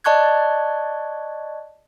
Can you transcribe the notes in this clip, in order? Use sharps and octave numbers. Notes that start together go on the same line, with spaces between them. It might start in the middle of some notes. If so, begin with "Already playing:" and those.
D5 D#5 A5 C#6 F#6 G#6